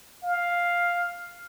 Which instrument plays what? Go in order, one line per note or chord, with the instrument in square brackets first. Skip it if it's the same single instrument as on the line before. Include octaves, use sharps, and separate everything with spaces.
[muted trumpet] F5